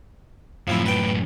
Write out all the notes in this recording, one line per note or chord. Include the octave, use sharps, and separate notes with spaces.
F#2 A2 F3 C4 E4
B4 G5